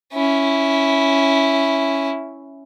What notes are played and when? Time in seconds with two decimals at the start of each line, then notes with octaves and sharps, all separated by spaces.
0.13 C#4 E4